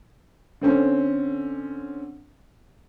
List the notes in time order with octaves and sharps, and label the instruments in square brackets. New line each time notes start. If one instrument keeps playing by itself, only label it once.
[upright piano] D3 C4 C#4